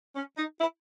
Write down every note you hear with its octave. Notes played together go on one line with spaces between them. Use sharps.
C#4
D#4
E4